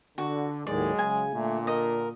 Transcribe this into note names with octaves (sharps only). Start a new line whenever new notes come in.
D3 F#4
D#2 A2 D#3 F#3 G#3 D5
C#3 G#5
A#2 D3 A3
A#4 D#5